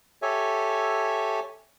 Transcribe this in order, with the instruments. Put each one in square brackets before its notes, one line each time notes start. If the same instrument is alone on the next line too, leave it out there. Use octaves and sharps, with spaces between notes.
[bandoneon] G4 A4 C#5 E5 G#5